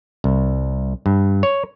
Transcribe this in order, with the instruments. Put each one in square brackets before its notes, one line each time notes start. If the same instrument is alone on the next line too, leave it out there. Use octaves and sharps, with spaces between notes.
[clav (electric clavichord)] C2
G2
C#5